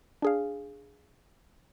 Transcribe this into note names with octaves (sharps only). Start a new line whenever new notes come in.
D4 G#4 F5